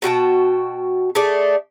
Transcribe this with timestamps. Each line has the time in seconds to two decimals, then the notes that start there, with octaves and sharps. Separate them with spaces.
0.02 B2 F#4 G5 A5
1.15 A3 G#4 D5